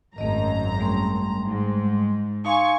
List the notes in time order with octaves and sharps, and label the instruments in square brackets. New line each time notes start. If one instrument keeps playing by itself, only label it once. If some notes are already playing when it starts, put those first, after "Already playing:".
[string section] G#1 F#2 A#5 [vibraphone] A3 D#5
[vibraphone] G3 A3 C6
[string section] G#2
[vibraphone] D#4 F5 C6 [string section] G#5 C#6